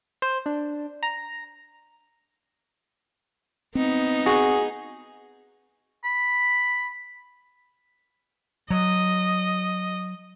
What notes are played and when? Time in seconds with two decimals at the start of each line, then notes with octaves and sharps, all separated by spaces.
0.22 C5
0.46 D4
1.03 A#5
3.75 B3 C4 D#4
4.26 F#4 G#4
6.04 B5
8.70 F#3 D#5